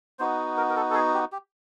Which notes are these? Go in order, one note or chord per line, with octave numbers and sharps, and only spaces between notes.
B3 D#4 F#4 C5
A#4
A#4
A4
A4
G#4
G4
G4